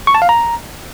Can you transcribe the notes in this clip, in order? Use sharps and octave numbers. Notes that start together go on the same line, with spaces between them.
C#6
A5
F5
A#5